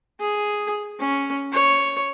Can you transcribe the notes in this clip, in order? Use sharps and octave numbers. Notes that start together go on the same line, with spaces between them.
G#4
C#4
C#5